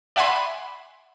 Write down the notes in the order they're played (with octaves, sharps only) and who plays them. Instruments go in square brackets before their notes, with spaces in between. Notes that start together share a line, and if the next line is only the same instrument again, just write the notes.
[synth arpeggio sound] D5 E5 F#5 G#5 B5 C6